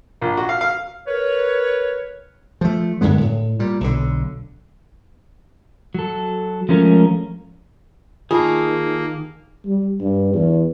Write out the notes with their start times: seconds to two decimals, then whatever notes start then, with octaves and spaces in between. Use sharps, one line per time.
0.22 A#1
0.37 F#4
0.49 F5
0.61 F5
1.07 A#4 B4 C#5
2.61 F3 A3
3.01 F#2 D3 G#3 B3
3.21 A2
3.59 A#2 G3
3.81 B1 D3
5.94 F#3 A4
6.69 F3 G#3 A3 C#4 A#4
8.31 D#3 A#3 F4 G#4 A5
9.66 G3
10.01 G2
10.34 E2